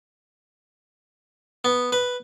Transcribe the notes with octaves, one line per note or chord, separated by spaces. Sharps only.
B3
B4